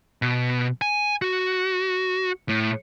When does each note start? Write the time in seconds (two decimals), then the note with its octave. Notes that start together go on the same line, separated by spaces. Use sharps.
0.22 B2
0.82 G#5
1.22 F#4
2.49 A2